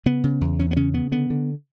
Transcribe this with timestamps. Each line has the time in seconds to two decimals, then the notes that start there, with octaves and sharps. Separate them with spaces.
0.06 C#3 B3
0.24 C#3
0.41 E2
0.59 E2 C#4
0.71 B3
0.76 C#3 C#4
0.94 C#3 B3
1.12 D3 B3
1.30 D3